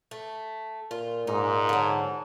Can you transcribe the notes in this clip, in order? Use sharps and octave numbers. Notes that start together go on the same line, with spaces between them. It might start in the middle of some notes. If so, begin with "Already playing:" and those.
A3
A#2 F4
G#2 D#4
D3 F#3